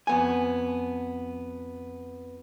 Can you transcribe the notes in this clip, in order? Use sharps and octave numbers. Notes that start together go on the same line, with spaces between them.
F2 B3 G#5